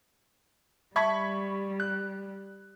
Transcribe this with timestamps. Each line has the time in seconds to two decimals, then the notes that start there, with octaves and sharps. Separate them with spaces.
0.96 G3 E5 A5 B5 C#6 G#6 B6
1.80 F#6